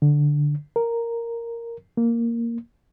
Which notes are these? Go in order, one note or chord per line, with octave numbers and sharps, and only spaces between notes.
D3
A#4
A#3